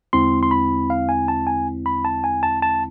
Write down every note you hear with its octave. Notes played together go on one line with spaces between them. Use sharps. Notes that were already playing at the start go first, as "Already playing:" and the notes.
E2 D3 G#3 C4 E4 C6
C6
B5
F5
G#5
A5
G#5
B5
A5
G#5
A5
A5